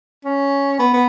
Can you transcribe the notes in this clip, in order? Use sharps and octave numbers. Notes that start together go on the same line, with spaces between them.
C#4
B3
B3